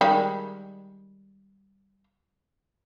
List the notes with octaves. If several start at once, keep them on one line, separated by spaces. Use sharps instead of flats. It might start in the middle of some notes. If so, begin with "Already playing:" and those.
D#3 G3 G#3